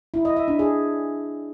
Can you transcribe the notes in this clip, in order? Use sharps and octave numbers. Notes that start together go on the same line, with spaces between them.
E4
D#5
E5
D4
G#4